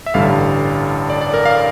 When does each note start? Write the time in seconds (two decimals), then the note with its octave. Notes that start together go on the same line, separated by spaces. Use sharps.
0.06 E5
0.14 A1 G2 D3 G3 F5
1.10 D5
1.21 D5
1.34 A#4
1.45 F5